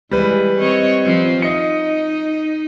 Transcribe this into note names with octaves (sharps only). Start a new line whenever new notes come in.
E3 G3 G#3 B4
C4 C#5 D#5
F3 C4
D#4 D#5 C#7